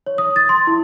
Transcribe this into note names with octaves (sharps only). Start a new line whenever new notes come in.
C#5
D#6
A6
C6
E4